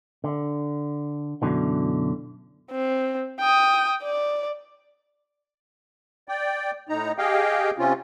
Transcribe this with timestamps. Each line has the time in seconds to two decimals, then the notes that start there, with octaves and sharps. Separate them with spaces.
0.24 D3
1.42 F#2 B2 D3 E3
2.72 C4
3.40 G5 D#6
4.03 D5
6.29 D5 G5
6.89 A2 D#4 A#5
7.18 G4 G#4 D#5 F5 G5
7.78 C3 C4 C#4 F4